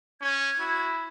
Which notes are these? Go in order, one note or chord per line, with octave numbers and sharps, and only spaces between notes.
C#4 G#6
E4 F#4